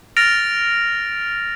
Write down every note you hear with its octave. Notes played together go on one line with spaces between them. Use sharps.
F6 A6 A#6 D7 F7